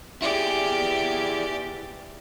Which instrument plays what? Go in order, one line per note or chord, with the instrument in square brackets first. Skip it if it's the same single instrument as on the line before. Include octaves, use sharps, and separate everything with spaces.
[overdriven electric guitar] E4 G#4 [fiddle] G4 D5